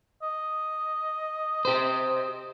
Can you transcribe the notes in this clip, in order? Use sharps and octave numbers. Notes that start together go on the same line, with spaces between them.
D#5
G4 C5